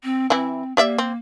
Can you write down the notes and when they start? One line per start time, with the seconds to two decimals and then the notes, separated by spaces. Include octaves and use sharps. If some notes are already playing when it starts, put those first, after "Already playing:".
0.04 C4
0.30 E3 C4 E4
0.77 A#3 G4 D5 E5
0.98 C4